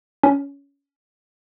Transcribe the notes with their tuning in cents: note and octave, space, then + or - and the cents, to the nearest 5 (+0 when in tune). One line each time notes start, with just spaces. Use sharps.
C#4 +20